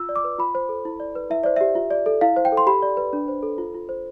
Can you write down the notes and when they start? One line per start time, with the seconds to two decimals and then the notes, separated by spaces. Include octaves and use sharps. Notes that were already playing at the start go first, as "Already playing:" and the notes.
Already playing: F4 E6
0.09 D5
0.16 D6
0.24 B4
0.38 F4 B5
0.55 C5
0.69 A4
0.85 E4
1.00 D5
1.15 B4
1.30 E4 E5
1.43 C5 D5
1.56 G4 E5
1.75 F4
1.91 D5
2.06 A4
2.21 E4 F5
2.36 C5
2.45 G5
2.52 A4
2.57 C6
2.67 G4 B5
2.82 D5
2.97 B4
3.13 D4
3.28 C5
3.43 A4
3.58 F4
3.74 F4
3.89 C5